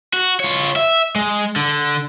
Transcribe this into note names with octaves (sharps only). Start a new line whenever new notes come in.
F#4
F4 C#5
E5
G#3
D3